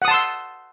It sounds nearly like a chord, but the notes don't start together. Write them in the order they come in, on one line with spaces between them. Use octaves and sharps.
F#5 D#6 A5 C6 E6